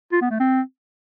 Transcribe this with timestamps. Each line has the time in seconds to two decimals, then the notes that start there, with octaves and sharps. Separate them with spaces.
0.12 F4
0.21 B3
0.31 A3
0.40 C4